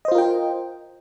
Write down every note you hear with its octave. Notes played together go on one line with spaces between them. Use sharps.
F4 A#4 C5 D#5 G5